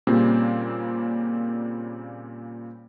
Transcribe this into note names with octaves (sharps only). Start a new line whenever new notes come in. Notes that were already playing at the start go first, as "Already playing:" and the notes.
A#2 C#3 G3 A#3 C4